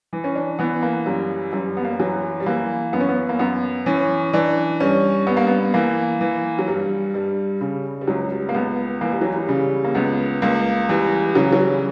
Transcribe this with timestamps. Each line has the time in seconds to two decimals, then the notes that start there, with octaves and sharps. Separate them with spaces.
0.13 E3
0.24 C#4
0.35 D4
0.59 E3 B3
0.82 A#3
1.06 F#2 G3
1.53 F#2 G3
1.77 B3
1.85 A#3
1.92 G3
1.99 E3 F#3
2.40 G3
2.46 E3 A#3
2.93 F#2 B3
3.00 C#4
3.09 B3
3.29 A#3
3.39 F#2 B3
3.86 E3 C#4
4.33 E3 D4
4.80 G2 C#4
5.27 G2 B3
5.37 A#3
5.47 B3
5.74 E3 A#3
6.21 E3
6.59 F#3
6.67 G2 G3
7.14 G2 G3
7.61 C#3 G3
8.01 G3
8.08 C#2 F#3
8.32 G3
8.49 A#3
8.54 C#2 B3
9.01 E3 A#3
9.12 G3
9.21 F#3
9.32 G3
9.48 C#3 G3
9.84 A#3
9.95 C#2 B3
10.42 C#2 A#3
10.89 E3 G3
11.35 C#3 F#3
11.53 F#3
11.59 G3